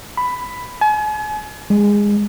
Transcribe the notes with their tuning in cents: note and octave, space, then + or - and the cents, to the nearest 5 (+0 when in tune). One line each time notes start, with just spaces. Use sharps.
B5 +10
G#5 +40
G#3 -20